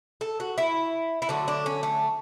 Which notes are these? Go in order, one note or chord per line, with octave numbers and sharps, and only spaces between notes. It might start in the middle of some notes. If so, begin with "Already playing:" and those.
A4
F#4
E4
E4
D3 F#3 A3 F#4
D4
C#4
A3